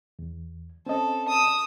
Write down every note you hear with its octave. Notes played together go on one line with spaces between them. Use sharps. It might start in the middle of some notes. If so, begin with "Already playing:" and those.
E2
C4 C#4 A4 D#5
D#6 E6